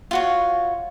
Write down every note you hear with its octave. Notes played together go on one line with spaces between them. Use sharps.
F4 F#4 C#5